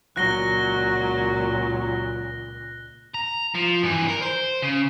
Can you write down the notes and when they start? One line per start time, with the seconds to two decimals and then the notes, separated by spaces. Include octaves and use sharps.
0.16 C#2 A#2 F#3 F#6 A#6 G7
3.14 A#5
3.55 F3
3.83 G2 E3
4.08 A#4
4.22 C5
4.62 C#3